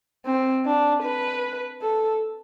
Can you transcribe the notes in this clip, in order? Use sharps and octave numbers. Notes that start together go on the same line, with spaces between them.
C4
D4
B4
A4